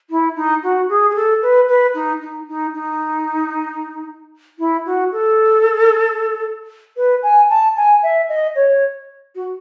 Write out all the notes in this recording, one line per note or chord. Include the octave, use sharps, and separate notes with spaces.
E4
D#4
F#4
G#4
G#4
A4
B4
B4
D#4
D#4
D#4
D#4
E4
F#4
A4
B4
G#5
A5
G#5
E5
D#5
C#5
F#4